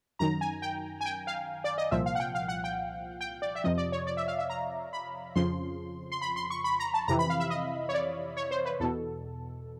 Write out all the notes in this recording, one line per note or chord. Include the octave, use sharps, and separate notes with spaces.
F#2 D#3 A#5
G#5
G5
G#5
G5
F5
D5
D#5
C2 A#2 F3 E5
F5
F#5
G5
F5
F#5
G5
G5
D5
E5
F2 C3 F3 D#5
D5
C#5
D5
E5
F5
E5
A#5
B5
F2 C#3 F3 C6
C6
B5
C6
C#6
B5
A#5
A5
F2 C3 E3 A#5
B5
F5
E5
D#5
C#5
D5
C#5
C5
B4
E2 B2 A4